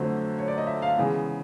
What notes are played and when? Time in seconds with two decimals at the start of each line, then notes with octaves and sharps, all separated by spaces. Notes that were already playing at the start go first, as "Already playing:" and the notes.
Already playing: F2 D3 F#3 A3 C5
0.39 C#5
0.48 D5
0.58 D#5
0.67 E5
0.82 F5
0.97 C#3 E3 G#3 B3